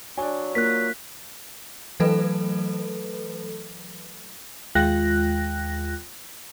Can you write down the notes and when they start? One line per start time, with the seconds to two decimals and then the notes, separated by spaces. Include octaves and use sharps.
0.17 F#3 D4 G#5
0.55 A#3 F4 F#6 B6
2.00 E3 F#3 A3 A4 B4
4.75 D#2 G#3 F4 G5 F#6 A#6